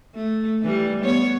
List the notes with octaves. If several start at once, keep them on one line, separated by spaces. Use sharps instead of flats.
A3
E3 G3
B3 C#5